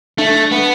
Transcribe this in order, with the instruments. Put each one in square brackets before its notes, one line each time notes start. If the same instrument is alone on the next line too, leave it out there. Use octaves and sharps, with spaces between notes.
[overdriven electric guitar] A3 [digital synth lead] D4
[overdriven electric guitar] B3